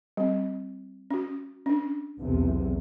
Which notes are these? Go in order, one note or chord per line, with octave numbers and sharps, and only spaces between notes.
G3 C4
C#4 F#4
C#4 D4
B1 E2 C3